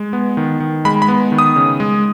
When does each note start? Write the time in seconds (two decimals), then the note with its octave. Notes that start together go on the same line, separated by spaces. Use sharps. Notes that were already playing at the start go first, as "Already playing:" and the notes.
Already playing: G#3
0.13 B3
0.37 D#3
0.60 D#3
0.85 G#3 B5
1.02 B5
1.08 B3
1.32 D#3
1.39 D#6
1.56 C#3
1.80 G#3